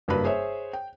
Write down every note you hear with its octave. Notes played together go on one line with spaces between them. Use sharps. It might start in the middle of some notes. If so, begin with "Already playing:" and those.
F#1 G2 F#3 A#3 B4 B5
G#4 C5 C#5 E5
G5